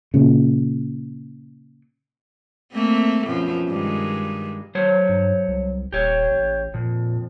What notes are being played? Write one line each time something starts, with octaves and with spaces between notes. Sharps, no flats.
A#2 C#3
A3 A#3 C4
F#2 B2 F3
G2 D#3 G#3
F#3 C5 C#5
G2
C2
D#1 G4 C#5
A1
F2 A#2